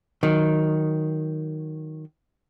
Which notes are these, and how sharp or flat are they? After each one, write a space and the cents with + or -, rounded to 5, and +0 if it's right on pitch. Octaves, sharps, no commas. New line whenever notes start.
D#3 +0 F#3 +0